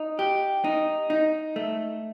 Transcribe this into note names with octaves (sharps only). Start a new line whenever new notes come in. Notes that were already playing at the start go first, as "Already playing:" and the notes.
Already playing: D#4
G4
D#4
D#4
A3